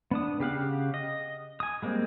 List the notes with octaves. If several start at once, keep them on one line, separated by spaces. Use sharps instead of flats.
B3 D4 D#6
C#3 G4 F5 F#5
D#5
G#5 D#6
G3 G#3 A#3 C4